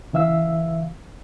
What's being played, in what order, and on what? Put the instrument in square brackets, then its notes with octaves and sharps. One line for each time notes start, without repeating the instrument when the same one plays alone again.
[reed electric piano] C#3 E3 E5 F5 E6